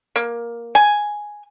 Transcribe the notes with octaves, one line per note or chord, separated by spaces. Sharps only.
A#3
G#5